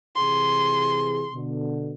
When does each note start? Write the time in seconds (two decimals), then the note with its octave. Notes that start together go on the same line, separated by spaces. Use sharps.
0.16 C3 E3 G#4 C6
1.31 B2 D3